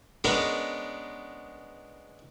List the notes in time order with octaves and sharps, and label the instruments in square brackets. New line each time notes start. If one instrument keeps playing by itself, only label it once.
[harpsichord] G#3 B3 C#4 D4 A#4